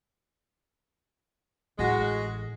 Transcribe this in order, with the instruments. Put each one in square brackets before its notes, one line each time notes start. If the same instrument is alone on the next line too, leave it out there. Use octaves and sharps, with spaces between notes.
[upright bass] A1 [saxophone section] G#3 F#4